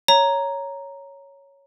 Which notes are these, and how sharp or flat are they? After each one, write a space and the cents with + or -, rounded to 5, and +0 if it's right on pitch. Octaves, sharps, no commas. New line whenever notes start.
C#5 +0 A#5 +0